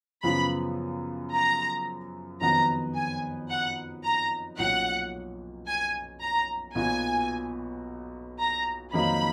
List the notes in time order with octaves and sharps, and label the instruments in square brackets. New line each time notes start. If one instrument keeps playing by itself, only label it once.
[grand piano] F#2 C#3 F3 B3 F4 [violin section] B5
[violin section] A#5
[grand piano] F2 D#3 F#3 B3 [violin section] A#5
[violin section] G#5
F#5
A#5
[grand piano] B1 A#2 F#3 C#4 [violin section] F#5
[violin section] G#5
A#5
[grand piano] B1 A#2 F#3 B3 F#4 [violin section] G#5
[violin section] A#5
[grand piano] F2 D#3 F#3 A#3 D#4 [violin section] B5